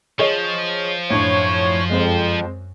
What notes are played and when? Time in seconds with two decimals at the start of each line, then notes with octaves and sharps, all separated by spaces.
0.19 F3 G#4 C#5 D#5
1.10 F#2 A2 D4 C#5
1.90 F2 G#3 C4 C5